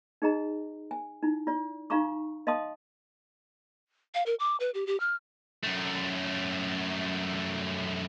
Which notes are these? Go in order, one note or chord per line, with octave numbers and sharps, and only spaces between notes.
D#4 G#4 D#5 A#5
G#5
D#4 E4
F4 D5
D#4 F4 F5 A#5 C#6 D6
D#5 F5 A5 C6 D#6
F5
A#4
D6
B4
G4
G4
F6
F#2 A3